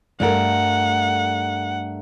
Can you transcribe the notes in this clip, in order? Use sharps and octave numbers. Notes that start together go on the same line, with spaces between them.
G2 A3 A#4 F#5